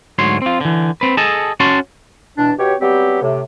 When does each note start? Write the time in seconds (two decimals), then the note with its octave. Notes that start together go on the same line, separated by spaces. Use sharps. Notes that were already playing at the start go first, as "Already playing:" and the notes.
0.19 D2 G#2 F#3 C#5 C6
0.42 C4 F4
0.61 D3 E3
1.01 C4 B4
1.17 G#4 A4 D#5 A5
1.60 C#4 F#4 A5 C6
2.38 E2 B2 D4
2.59 B2 G4 C#5
2.81 F#3 G3 B3 C4 G4
3.22 A2 C3